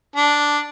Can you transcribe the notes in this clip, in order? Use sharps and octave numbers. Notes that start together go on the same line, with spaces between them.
D4